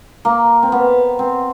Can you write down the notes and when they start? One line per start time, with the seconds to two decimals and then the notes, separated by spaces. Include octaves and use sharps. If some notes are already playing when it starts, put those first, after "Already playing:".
0.25 A#3
0.63 C4
0.72 B3
1.19 C4